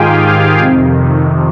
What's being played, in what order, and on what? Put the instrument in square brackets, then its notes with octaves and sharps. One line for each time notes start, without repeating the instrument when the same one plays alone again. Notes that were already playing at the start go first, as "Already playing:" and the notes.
Already playing: [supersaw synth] G#2 D#3 F4 G4 G#4 F5 G5 G#5
F2 C3 D#3